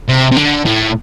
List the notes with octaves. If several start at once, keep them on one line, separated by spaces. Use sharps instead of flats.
C3
C3
D3
A2